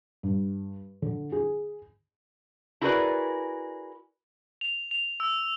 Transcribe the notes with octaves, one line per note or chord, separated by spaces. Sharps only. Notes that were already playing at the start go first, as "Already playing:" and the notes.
G2
D3
G#4
E4 F#4 G#4 A#4 B4 D5
F7
F7
E6